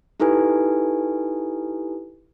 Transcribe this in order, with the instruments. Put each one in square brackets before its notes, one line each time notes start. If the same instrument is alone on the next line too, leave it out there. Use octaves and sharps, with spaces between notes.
[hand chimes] D#4 E4 G4 A4 B4 G#5